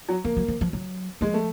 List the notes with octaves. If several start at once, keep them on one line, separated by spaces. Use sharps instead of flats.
F#3
F3 A#3
F#3
F3
F3
F#3
F3 G#3
A3